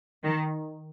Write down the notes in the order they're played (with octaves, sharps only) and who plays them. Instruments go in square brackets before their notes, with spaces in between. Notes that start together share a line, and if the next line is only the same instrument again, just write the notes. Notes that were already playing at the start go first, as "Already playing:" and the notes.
[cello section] D#3